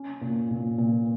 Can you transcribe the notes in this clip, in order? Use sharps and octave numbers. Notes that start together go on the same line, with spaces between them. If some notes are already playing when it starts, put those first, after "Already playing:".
Already playing: C#4
A#2
A#2
A#2